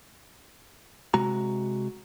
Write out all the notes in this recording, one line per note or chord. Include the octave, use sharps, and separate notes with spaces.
C3 G#3 F#4 A#5